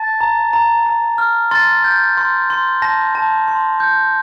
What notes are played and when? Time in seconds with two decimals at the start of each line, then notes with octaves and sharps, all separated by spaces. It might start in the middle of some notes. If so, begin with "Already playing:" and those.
Already playing: A5 A6
0.21 A#5
0.53 A#5
0.86 A#5
1.18 F6
1.51 C6 A6
1.84 G6
2.17 C6
2.50 C6
2.82 A5 A#6
3.15 A5
3.48 C6
3.80 G6